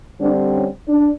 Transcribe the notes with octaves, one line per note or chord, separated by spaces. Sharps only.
D3 G3 C4 D4
C#4
D4